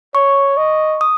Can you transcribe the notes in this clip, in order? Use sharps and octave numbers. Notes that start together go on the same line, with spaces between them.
C#5 C#6
D#5
D#6